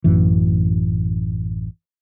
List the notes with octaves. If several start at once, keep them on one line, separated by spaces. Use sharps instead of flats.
A1 F#2 E3